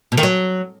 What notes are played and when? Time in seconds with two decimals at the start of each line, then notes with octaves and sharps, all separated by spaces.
0.12 B2
0.17 D#3
0.23 F#3